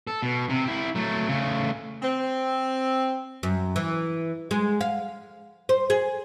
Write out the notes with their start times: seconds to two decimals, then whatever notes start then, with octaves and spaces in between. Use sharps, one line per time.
0.07 A4
0.22 B2
0.49 C3
0.64 E4 G4
0.95 F#3 A3
1.28 C#3 A3
2.02 C4
3.43 F#2
3.76 E3
4.51 G#3
4.81 F5
5.69 C5
5.90 G#4